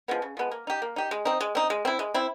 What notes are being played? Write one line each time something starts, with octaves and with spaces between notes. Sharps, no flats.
F3 G#3 B3
C#3
F3 G#3 B3
A#3
D#4 G4
A#3
D#4 G4
G#3
C4 D#4
G#3
C4 D#4
G#3
C4 E4
G#3
C4 E4